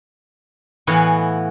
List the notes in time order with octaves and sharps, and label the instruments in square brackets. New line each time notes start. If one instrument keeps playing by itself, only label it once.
[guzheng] A2 E3 B3 F#4 F5 G#5